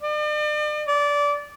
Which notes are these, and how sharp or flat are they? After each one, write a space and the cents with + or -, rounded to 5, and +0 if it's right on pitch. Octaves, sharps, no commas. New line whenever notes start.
D5 +40
D5 -20